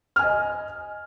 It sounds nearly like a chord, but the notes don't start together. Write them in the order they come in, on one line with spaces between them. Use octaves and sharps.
F6 G#5 D#5